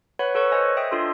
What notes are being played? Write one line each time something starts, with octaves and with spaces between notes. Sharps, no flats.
B4 C#5 F#5 B5
A4 B4 C#5 C#6
C5 D#5 G#5
D#5 E5 G5 D#6
D4 F4 A4 C6